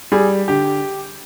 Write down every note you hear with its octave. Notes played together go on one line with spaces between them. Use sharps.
G3 G#4
D3 G4